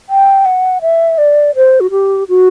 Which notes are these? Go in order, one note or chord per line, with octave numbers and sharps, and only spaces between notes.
G5
F#5
E5
D5
C5
F#4
G4
F#4